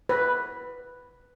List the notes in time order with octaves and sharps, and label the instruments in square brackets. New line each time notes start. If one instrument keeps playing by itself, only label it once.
[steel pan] B4